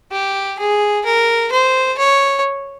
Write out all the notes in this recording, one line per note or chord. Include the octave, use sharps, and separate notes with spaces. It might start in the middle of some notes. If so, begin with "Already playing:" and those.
G4
G#4
A#4
C5
C#5